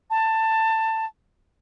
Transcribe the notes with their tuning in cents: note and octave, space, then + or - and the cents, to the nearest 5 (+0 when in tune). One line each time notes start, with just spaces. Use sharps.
A5 +15